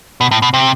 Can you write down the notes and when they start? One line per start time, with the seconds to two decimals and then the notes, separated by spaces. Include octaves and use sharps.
0.21 B2
0.31 A2
0.42 B2
0.54 C3